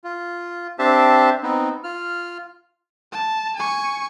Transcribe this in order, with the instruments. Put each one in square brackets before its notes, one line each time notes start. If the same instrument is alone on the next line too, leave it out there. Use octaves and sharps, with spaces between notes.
[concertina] F4
C4 D4 G4 C5 E5 A5
B3 C4 D#4
F4 F6
[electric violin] A5
G#5 C#6